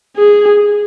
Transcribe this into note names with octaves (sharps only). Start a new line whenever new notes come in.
G#4